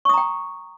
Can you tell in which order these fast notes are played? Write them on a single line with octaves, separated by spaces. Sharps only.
C#6 D#6 A#5 G5